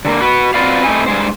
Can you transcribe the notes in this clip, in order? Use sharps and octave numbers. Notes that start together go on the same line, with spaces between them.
D3 G#3 A#3
F#4 B4
C4 F4 F#4 B4 D5 F5
A3 C4 D#4 E4 G#5
G2 C#3 G#3 C5